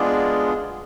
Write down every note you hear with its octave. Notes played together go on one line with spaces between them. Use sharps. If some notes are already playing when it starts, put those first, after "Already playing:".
Already playing: G#3 B3 D4 F4 G#4 D5